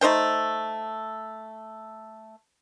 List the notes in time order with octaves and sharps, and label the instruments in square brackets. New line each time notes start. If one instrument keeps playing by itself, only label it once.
[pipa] A3 D#4 C5 G5